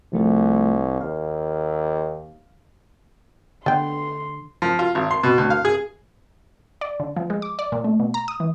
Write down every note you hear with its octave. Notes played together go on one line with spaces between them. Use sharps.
C2 F3 A3 F4
D#2 F5
D3 B3 G5 C6
F3
F4
G#1
C6
B2
D2
F5
G#4
D5
D3
F3
G#3
D6
D5
A#2
A3
B2
A#5
D#6
E3